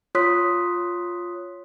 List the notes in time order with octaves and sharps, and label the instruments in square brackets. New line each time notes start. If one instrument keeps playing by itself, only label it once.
[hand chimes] F4 C#5 C6 D#6 F#6 B6